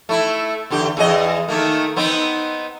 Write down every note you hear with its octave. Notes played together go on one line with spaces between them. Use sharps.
A3 E4
E2 D3 G4
E2 G#4 D#5
D#3 A3 A#3
B3 C4 D#4